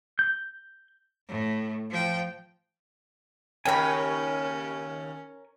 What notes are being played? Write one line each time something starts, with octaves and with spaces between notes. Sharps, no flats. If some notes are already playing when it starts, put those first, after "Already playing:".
G6
A2
F3 G5
D#2 C#3 C#4 A#4 C#5 G5 G#5 B5